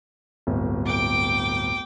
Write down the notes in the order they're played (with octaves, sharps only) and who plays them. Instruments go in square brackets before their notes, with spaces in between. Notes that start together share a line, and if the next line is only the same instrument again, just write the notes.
[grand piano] D1 G1
[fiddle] G5 D6